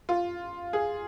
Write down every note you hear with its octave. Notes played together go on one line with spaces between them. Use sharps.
F4
G#4